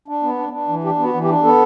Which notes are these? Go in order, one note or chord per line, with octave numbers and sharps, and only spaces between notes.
D4
B3
D4
D4
E3
D4 G4
B3
F#4
E3
G4
D4
B3 A4